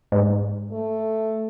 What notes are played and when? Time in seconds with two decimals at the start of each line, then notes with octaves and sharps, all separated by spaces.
0.12 G#2
0.72 A3